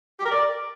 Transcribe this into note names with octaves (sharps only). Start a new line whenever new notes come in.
G4
A#4
D5